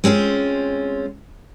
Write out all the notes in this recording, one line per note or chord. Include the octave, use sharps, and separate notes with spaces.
G#3 C4 C#4 F4